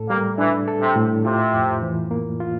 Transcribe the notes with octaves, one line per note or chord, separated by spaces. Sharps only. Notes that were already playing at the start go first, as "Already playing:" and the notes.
Already playing: A2 A4
G3 A#3
E3 D4
A4
C3
A2
C3 F4
F2
E3
A#3
F4